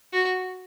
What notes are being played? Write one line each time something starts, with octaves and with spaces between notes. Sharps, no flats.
F#4